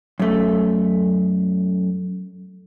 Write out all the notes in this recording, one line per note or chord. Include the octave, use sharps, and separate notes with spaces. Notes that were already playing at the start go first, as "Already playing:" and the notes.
F#2 A3